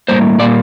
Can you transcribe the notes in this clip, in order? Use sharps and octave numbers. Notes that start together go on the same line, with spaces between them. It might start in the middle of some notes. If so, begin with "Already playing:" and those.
A2 G3 A#3 C5
A#2 G3 A#3 D5